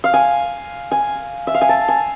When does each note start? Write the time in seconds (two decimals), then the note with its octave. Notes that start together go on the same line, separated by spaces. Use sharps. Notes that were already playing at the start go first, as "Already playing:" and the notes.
0.04 F5
0.14 G#5
0.91 G#5
1.47 E5
1.54 F5
1.61 G#5
1.69 A5
1.88 G#5